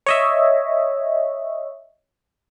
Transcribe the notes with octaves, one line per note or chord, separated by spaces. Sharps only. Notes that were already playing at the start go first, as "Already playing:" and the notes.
C#5 D#5 E5